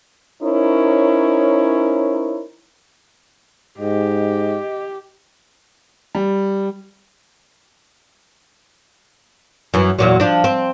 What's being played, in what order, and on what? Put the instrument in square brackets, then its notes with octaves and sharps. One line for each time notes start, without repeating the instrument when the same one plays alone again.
[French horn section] C#4 D#4 E4 A#4 C5 C#5
[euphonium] G#2 [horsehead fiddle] G4 [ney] D#5
[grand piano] G3
[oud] F#2 E3
E2 A#2 F#3
F3 D4
C4